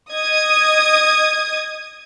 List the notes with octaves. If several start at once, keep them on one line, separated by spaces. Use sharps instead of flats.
D#5 D#6 G#6